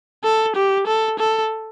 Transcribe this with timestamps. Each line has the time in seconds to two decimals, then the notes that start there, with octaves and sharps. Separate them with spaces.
0.24 A4
0.56 G4
0.87 A4
1.19 A4